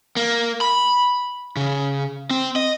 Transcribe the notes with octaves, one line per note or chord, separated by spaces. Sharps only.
A#3
B5
C#3
C4
D#5